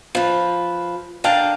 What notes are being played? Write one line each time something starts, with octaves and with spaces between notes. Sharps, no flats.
F3 B4
D3 D4 A#4 F5 G5 A5